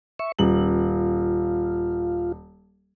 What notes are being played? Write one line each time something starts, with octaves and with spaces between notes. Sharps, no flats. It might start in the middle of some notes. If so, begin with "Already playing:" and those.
E5 C#6
D#1 F4 F#7